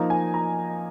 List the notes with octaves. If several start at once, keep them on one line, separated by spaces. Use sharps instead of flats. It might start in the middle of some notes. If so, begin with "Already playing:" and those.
Already playing: F3 A#3 D#4 A#5
G#5
A#5